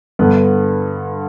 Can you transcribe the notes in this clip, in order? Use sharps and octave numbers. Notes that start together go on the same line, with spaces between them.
G2 D3 B3